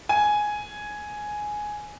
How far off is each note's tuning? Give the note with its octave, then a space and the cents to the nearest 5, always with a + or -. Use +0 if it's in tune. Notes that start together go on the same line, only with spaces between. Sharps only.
G#5 +5